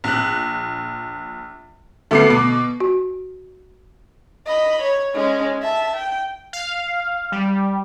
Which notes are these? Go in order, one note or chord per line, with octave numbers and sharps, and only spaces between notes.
A#1 F#6
D2 A3 B3 D6 C7
B2 D6
F#4
D#5 B5
C#5
G#3 C#4
E5 A5
G5
F5
G3